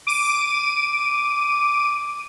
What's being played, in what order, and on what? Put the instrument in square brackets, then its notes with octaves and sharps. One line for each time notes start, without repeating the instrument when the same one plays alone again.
[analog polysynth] D6 D#7